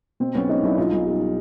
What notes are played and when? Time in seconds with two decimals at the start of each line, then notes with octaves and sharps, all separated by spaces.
0.20 B2 C4
0.34 B1 B3 C#4
0.49 G#3 C#4 D#4
0.63 B1 D4 E4
0.78 B2 D#4 F4
0.92 B1
1.06 G3